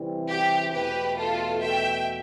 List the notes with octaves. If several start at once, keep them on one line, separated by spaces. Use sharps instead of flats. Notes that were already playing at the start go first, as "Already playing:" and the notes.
Already playing: C3 E3 G3 C4 E4
G4
E2 B2 A3 G4 B4
F4 A4
E5 G5